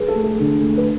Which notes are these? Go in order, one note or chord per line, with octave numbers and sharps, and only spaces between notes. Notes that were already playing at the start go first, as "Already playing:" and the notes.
Already playing: G#4 B4
A4
A3
A4
D3
A3
B4